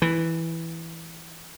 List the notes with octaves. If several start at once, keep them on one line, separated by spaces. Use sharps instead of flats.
E3